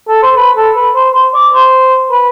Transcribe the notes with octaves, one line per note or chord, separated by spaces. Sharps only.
A4
C5
B4
A4
B4
C5
C5
D5
C5
B4